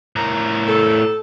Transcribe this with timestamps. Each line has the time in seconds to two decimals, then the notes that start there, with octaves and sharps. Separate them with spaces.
0.16 A2 A#4
0.67 A4